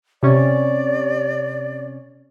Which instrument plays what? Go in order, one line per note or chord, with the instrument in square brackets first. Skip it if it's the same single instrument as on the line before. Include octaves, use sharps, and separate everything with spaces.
[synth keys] C3 C#4 C#5 [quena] D5